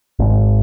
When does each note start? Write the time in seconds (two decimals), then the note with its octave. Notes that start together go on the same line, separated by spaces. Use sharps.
0.19 G#1